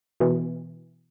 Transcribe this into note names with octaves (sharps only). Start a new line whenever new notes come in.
B2 E3